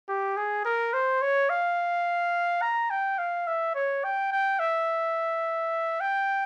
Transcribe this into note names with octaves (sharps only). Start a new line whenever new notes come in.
G4
G#4
A#4
C5
C#5
F5
A#5
G5
F5
E5
C#5
G5
G5
E5
G5